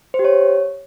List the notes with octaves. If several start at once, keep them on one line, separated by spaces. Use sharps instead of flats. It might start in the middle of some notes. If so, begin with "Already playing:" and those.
C5
G4
C#5